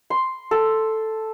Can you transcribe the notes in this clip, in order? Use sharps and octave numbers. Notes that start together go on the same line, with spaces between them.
C6
A4